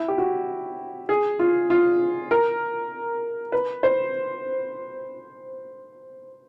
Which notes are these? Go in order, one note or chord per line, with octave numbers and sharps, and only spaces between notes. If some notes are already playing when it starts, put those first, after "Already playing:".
Already playing: E4
G4
F#4
G#4
F4
F4
A#4
B4
C5